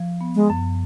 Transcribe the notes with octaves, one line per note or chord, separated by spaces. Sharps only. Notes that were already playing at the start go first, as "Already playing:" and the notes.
Already playing: F3
B3
G#3
F#2